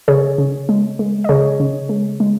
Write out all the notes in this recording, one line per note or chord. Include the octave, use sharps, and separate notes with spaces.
C#3 G#4 C#5
C#3
G#3
G#3
D#5
C#3 G#4 C#5
C#3
G#3
G#3